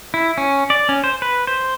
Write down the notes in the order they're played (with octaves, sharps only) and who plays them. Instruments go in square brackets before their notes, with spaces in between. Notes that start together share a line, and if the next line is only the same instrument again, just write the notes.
[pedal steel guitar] E4
C#4
D5
C#4
C5
B4
C5